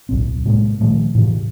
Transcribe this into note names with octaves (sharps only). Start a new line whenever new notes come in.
D1 B1 C4
A2 C3 G#3 A#3
A#2 D#3 F3 A3
A2 C3 E3